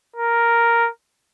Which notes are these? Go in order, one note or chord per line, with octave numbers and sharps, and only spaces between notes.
A#4